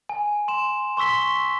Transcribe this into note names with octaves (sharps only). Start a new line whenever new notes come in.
G#5
C6 E7
C6 C#6 E6 B6 G7